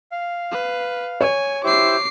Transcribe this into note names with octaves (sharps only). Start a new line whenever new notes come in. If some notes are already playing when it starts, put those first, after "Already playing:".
F5
B4
C#5 G#5
E4 G4 C5 D6 C7